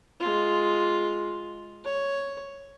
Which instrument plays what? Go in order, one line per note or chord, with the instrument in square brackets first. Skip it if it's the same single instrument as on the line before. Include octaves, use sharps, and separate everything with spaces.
[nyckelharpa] G#3 F4
C#5